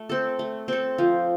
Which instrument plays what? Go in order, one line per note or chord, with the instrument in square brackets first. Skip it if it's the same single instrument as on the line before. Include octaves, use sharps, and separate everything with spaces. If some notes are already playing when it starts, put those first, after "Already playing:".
Already playing: [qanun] A3
C4 A4
A3
C4 A4
F3